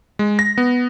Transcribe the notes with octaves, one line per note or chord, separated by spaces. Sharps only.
G#3
A#6
B3